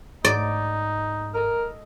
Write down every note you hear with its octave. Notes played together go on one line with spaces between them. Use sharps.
G#2 D#4 D5
A4 A#4 D#5